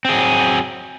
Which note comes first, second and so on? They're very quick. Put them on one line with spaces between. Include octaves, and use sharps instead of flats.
C4 G#4 F#3